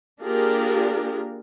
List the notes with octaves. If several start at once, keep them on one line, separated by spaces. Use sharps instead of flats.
A#3 D4 F4 G4 G#4 A#4